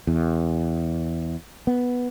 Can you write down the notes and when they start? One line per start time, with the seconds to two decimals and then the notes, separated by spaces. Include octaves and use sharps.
0.07 E2
1.67 B3